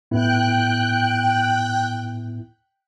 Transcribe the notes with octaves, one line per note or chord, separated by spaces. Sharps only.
A2 B3 E4 G5 F#6